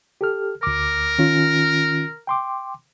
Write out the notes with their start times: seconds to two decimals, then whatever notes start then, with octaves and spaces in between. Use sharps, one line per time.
0.21 G4 A4 F6
0.63 D2 A#4 D6
1.19 D#3 C#4 F4
2.27 G5 C6 D6